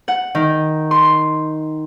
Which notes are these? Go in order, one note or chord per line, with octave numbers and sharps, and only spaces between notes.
F#5
D#3
C6